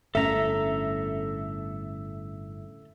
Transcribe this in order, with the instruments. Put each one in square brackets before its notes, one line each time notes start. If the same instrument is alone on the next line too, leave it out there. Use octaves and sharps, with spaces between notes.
[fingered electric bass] G1 A2 C#4 [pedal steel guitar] A4 A#5 [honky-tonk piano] E5